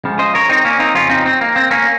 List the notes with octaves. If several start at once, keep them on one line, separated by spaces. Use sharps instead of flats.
C#2 C#3 F3
C5 D#5
A#4 C#5
C4 D#4
A#3 C#4
C4 D#4
F2 C#3 F3 C#4 F4
C4 D#4
C4
A#3
C4
A#3 C#4